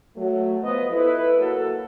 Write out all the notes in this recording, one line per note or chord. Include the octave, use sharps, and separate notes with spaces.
F#3 A3
F3 B3 B4 D#5
E4 A4 B4
F#3 A#3 A4